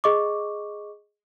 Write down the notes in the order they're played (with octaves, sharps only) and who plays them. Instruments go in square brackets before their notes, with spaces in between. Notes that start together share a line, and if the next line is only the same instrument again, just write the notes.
[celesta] G#4 D#5 C#6 D6